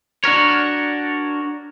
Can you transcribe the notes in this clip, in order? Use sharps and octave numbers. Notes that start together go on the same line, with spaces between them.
D4 F#4 A#4 C#5